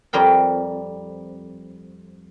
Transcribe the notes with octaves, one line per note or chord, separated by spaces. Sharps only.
F2 G3 A#4 G5